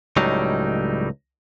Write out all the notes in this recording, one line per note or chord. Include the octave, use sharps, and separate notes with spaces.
C#2 A2 F#3 G3 D#4